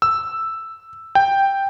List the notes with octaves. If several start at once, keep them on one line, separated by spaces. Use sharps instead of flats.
E6
G5